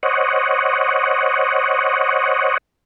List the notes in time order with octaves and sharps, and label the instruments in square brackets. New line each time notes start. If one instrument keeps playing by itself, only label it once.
[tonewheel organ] C5 C#5 D#5 F#5